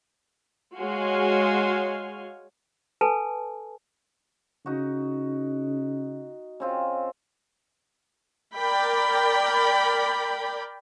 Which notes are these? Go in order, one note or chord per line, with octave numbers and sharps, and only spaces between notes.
G#3 F#4 C#5 F5 G#5 C6
A4 B4 G#5 A5
C#3 D#4 F#4
C#3 C4 F4
A#4 D5 G5 B5